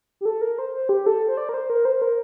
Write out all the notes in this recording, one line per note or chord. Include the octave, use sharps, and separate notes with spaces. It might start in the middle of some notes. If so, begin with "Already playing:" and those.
G4
A4
A#4
C5
C5
G4
A4
C5
D5
A#4
C5
A#4
C5
A#4